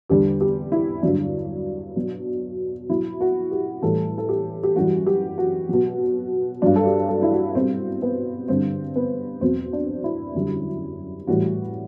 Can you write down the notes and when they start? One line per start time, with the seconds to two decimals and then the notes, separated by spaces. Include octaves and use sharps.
0.09 E2 D3 G3 G4
0.41 G4
0.72 E4
1.02 G2 D3 F#3 D4
1.96 B2 F#3
2.90 B2 F#3 E4
3.21 F#4
3.51 G4
3.82 A2 E3 G3 A4
4.18 A4
4.29 G4
4.63 G4
4.76 F#2 E3 G3 F#4
5.06 G4
5.38 F#4
5.69 B2 F#3
6.62 G2 F#3 D4
6.76 A4
6.86 G4
7.08 A4
7.22 E4
7.32 F#4
7.55 B2 G3 C4
8.02 B3
8.48 G2 D3 G3 C4
8.96 B3
9.41 E2 B2 F#3 C4
9.73 D4
10.04 E4
10.35 F#2 D3 G3
11.27 A2 E3 G3 F#4